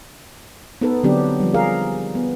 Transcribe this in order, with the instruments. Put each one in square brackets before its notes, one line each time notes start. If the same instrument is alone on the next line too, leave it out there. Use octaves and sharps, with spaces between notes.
[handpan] B3 D#4 A4 B4
D3 F#3 B3 C4 D4 G4
F3 G3
G#4 A#4 F5
B3